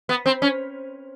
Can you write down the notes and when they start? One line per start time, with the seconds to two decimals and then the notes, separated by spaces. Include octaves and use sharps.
0.09 B3
0.26 C4
0.42 C#4